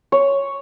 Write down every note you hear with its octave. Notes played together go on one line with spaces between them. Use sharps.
C#5